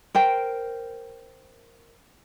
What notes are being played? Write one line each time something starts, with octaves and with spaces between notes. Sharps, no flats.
A#4 C5 G5